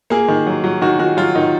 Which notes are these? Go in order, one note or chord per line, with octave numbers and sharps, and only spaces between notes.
A#3 G#4
D#3
F#3
F#3
D#3 F#4
D#3 F#4
F#3 F4
D#3 D#4